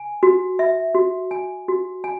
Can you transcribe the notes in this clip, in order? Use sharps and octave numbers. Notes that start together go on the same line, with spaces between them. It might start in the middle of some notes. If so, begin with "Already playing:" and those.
Already playing: G#5
F#4
E5
F#4
G#5
F#4
G#5